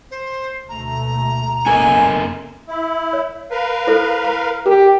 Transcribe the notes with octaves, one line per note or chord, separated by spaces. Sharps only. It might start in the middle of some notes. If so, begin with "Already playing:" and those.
C5
D2 B2 A3 A#5
F#1 A#3 C#4 A4 A#4 G#5
E4
C#5
A#4 B4 F5
E4 A4 C5
A#5
G4 A#4